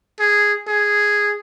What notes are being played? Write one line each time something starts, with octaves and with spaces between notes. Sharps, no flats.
G#4
G#4